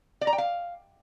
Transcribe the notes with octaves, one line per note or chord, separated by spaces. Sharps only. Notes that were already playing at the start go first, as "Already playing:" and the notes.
D5
A#5
G5
F5